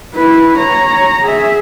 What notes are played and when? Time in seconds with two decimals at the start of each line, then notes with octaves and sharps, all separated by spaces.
0.15 E4 B4
0.58 C#5 A#5
1.25 G#4 E5